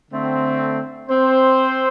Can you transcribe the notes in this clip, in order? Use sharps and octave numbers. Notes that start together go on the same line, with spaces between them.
D3 A3 C4
C4 C5